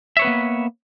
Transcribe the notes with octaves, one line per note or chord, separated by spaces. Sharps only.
A#3 B3 B4 C#5 E5